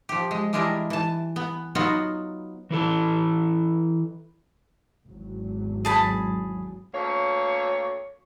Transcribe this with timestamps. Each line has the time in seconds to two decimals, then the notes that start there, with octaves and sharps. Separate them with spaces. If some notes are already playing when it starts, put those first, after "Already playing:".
0.09 F3 G4
0.31 G#3
0.53 E3 G3 G#3 D4 E4 A#4
0.90 E3 A5
1.36 B3
1.75 F#3 B3 D#4 F4 F#4
2.70 E3 E4 A4 A5
5.06 G#1 E2 F#3
5.85 G#4 A5 B5
6.94 D2 A#3 C#5